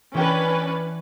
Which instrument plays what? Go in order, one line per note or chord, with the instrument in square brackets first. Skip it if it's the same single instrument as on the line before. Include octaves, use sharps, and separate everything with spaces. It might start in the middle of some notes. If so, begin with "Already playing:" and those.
[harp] E3 G5 [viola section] C#4 D4 B4